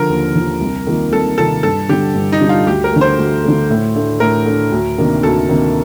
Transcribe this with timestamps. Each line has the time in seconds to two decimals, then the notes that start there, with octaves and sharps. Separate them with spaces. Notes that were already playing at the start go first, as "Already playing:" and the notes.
Already playing: D3 F3 A#4
0.09 D#2
0.35 D3 F3
0.61 C2
0.86 C3 D#3 A#3 F4
1.12 C2 A4
1.38 C3 D#3 A#3 F4 A4
1.63 G2 A4
1.89 D3 G3 G4
2.15 G2
2.32 D#4
2.41 D3 G3
2.49 F4
2.67 D2 G4
2.84 A#4
2.92 D3 A3
3.01 C5
3.18 D2
3.44 D3 A3
3.70 A2
3.95 A3 D4
4.20 A2 A#4
4.46 A3 D4
4.72 D2
4.98 C3 D#3 A#3 D4
5.23 D2 A4
5.49 C3 D#3 A#3 D4